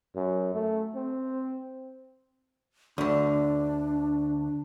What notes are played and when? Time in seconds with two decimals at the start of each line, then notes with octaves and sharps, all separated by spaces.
0.15 F#2
0.54 A3
0.95 C4
2.98 D2 D3 D4